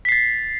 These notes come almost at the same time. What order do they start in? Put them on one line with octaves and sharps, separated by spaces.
B6 C7 A6